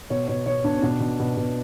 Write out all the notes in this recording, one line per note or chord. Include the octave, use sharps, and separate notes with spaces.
B2 C#5
B2 C#5
B2 C#5
B2 D4
C#4
B2 D4
B2
B2
B2